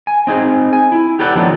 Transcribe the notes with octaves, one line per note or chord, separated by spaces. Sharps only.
G#5
C4 D#4 G#4
G#5
E4
G4 A4 B4 D5 F#5
D#3 F3 F#3 A3 B3 D4